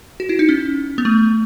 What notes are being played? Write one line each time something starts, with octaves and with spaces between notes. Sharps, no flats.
F#4
E4
D#4
C#4
B3
A3